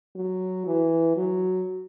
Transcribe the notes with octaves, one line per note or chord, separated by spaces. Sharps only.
F#3
E3
F#3